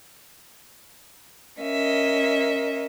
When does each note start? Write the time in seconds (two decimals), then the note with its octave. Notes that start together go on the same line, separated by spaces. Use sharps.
1.59 C#4 A#4 D#5 E5